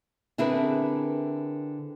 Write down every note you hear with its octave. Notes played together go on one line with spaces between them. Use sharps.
D3 C4 E4 G#4 A#4 B4